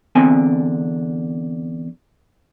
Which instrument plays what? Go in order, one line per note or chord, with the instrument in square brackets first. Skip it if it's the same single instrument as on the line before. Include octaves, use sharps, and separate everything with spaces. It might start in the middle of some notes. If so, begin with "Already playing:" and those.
[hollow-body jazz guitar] E2 D3 C4 G#5